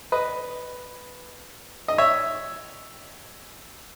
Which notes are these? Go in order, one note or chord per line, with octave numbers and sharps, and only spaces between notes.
B4 D#5
D#5
C#5 E5